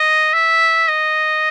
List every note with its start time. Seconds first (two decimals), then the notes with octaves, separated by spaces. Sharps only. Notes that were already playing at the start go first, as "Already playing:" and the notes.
Already playing: D#5
0.33 E5
0.88 D#5